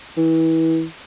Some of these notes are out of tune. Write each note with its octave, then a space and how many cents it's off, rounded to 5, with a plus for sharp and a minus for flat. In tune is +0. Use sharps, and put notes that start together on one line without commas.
E3 -30